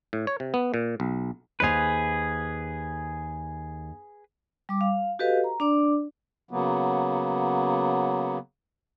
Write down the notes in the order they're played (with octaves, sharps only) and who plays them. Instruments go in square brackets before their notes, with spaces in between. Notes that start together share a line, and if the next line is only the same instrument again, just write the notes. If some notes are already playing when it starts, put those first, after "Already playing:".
[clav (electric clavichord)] A2
C#5
C3
B3
A#2
B1
[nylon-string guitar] D#2 C5 F5 [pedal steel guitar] G#4 B4
[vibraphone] G3 D6
F5
F#4 G4 A4 B4 D#5 F5
A#5
D4 D5 D6
[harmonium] C#3 F#3 A#3 B3